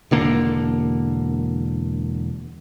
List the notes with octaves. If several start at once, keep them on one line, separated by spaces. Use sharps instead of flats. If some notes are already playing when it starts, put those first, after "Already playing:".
E1 D3 A#3